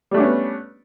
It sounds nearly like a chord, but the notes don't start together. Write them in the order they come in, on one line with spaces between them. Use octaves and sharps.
G3 A3 D4 C#4 B3